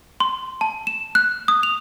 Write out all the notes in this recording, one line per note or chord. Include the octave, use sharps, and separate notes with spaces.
C6
A5
E7
F#6
D#6
F7